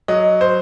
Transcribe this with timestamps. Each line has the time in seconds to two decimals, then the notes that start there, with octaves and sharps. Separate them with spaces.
0.08 F#3 D#5
0.41 C5